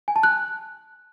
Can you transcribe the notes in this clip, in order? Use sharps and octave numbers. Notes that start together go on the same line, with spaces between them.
G#5
A5
F#6